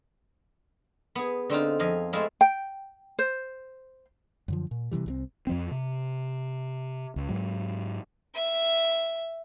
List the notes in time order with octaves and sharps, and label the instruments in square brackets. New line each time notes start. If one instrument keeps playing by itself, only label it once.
[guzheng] B3 G#4
D3 C4 D#4 F4
F2 D#5 F5 G#5
G#3 A3 C4 E4 F4 G#4
[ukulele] G5
C5
[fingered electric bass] F#2 D3 F3
A#2
C3 D#3 E3 G3
C2 F#3 C4
F2 F3 C4
C3
C#2
G#2 F#3
[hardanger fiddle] E5